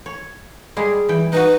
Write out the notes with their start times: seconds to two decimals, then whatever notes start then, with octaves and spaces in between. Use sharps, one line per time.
0.06 C#5
0.77 G3 G#3 G#4
1.09 E3 G5
1.33 D#4 F#4 B4